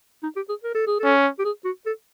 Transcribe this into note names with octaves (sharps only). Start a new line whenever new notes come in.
D#4
G4
G#4
A#4
A4
G#4
C#4 A4
G4
G#4
F#4
A4